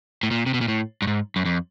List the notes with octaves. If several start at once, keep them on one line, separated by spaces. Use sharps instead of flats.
A2
A#2
C3
B2
A#2
A2
G2
G#2
F#2
F2